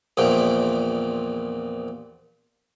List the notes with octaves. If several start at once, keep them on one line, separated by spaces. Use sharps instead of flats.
A#1 E2 A#2 F3 G5